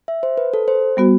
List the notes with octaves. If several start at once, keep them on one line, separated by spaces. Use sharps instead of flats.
E5
C5
B4
A4
C5
G3 B3 F#4